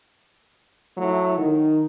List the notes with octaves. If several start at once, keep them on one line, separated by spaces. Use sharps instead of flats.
F#3 A3 E4
D#3